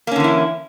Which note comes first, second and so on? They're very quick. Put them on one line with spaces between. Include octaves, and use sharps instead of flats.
A#3 C#4 D3 E3 E4